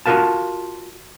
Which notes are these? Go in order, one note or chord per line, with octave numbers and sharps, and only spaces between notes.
F4 F#4 G#4 A#4 F5 A5